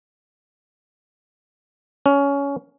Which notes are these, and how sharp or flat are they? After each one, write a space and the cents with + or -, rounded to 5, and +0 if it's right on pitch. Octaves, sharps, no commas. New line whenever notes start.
C#4 +20